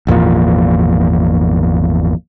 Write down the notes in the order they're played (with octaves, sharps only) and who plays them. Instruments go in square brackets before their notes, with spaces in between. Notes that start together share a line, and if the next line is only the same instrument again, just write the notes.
[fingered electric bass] G#1 E2 A#2 F3